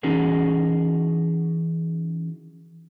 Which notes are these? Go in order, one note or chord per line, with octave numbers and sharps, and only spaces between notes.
E3 C#4 D#4 F#4 G#4 A#4